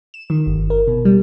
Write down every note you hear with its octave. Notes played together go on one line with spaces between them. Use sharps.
E7
D#3
G1
A#4
B2
G3